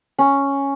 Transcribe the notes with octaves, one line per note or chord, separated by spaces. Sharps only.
C#4